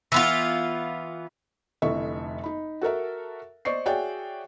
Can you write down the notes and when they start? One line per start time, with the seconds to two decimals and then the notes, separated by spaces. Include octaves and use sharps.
0.12 E3 B3 F4
1.82 F1 F2 D3 E4 E5 C#6
2.44 D#4 B5
2.81 F#4 A4 A#4 E5
3.65 C5 D5 D#5 C#6 C7
3.86 F#4 G#4 C#5 D5 E5 G5